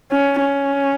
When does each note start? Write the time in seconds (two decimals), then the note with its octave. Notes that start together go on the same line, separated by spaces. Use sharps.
0.12 C#4
0.41 C#4